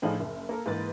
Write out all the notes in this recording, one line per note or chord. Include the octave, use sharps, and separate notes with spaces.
A2 F3 D4 D#4 F4 G#4
F#1
A#3 A4 A#4
G#2 E3 A#3 B4 A6